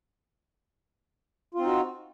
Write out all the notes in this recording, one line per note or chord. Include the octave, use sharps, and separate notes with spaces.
C4 D#4 F4 F#4